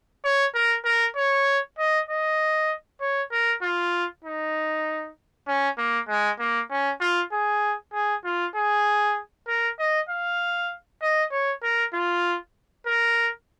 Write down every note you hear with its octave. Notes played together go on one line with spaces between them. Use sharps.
C#5
A#4
A#4
C#5
D#5
D#5
C#5
A#4
F4
D#4
C#4
A#3
G#3
A#3
C#4
F4
G#4
G#4
F4
G#4
A#4
D#5
F5
D#5
C#5
A#4
F4
A#4